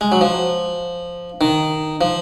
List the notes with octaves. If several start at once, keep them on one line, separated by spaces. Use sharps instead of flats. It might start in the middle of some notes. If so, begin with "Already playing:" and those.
G#3
F#3
F3
D#3
F3